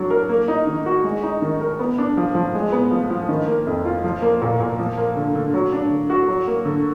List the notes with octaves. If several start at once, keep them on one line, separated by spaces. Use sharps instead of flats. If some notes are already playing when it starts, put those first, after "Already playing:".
Already playing: F#3 D4
A#4
A#3
D#4
D#3
F#4
G#3
D#4
D#3
A#4
B3
D4
F3
F3
G#3
B3
F3
F3
D#3
A#3
F2
F4
F3
A#3
A#2
A#2
F3
A#3
D3
D3
F#3
D4
D3
F#4
F#3
A#3
D3